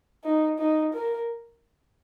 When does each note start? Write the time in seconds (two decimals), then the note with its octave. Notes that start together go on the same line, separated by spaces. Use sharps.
0.24 D#4
0.58 D#4
0.93 A#4